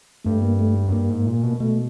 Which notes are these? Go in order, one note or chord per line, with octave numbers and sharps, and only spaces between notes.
G2 A3
A#3
A3
F#2
G2 A#3
G#2
A#2
B2
B2 A3